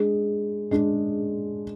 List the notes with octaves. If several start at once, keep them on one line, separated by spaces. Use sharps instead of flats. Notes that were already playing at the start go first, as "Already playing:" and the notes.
Already playing: G#3 D4 G#4
G#3 D4 G#4